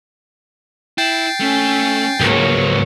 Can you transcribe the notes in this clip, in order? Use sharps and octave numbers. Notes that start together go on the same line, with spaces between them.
E4 G5 A6 C7
A3 C#4 G#5
C#2 G#2 F#3 A#3 C#5